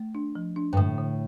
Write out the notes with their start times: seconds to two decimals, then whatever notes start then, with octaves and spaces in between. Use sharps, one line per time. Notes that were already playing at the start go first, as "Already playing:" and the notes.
Already playing: A3
0.15 D4
0.35 F3
0.56 D4
0.73 G2
0.77 A2 D3
0.98 D3